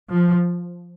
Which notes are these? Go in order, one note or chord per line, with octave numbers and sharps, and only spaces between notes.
F3